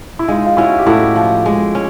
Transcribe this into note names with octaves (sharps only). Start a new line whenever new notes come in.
E4
G#3 D#4 F4
F4
C#4 E4 F#4
G4
A2 E4 F#4
F3
G#3
C#4